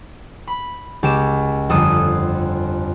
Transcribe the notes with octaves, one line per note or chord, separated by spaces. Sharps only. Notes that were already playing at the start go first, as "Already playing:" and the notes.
B5
C#2 G4 E7
G1 F2 A4 D#6